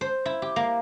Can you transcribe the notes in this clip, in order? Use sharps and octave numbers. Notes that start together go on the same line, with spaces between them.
C5
E4
G4
A#3